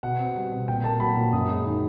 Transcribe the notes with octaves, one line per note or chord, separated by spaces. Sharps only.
B2 F#5
C4
G3
B2
A#2 G5
A#3 A5
F#3 B5
A#2
F#2 D#6
G#3
D#3